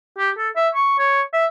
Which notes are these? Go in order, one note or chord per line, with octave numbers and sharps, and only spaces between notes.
G4
A4
E5
C#6
C#5
E5